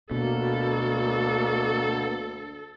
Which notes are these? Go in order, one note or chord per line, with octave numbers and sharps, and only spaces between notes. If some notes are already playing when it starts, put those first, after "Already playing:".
D2 B2 A#3 A4